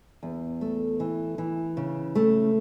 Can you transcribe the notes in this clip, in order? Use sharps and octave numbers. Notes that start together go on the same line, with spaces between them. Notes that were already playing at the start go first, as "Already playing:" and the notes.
E2
A3
E3
E3
C#3
A3